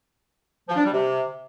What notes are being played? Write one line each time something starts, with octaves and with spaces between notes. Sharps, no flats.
F3
D4
G3
C3